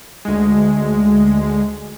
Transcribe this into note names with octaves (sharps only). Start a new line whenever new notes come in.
D2 G#3